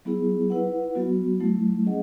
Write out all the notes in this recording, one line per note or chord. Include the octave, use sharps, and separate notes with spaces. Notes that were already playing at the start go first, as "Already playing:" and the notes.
F#3 B3 E4 G#4
E4 B4 F#5
F#3 B3 F#4
F#3 A3 E4
C#4 G#4 D#5 F#5